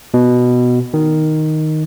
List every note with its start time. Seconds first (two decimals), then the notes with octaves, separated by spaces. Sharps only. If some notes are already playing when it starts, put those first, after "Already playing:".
0.14 B2
0.94 D#3